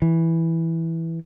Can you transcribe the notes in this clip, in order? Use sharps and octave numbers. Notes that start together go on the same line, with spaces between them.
E3